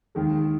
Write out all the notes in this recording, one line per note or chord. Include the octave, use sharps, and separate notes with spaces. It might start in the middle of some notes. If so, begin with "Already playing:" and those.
D#2 D#3 G#3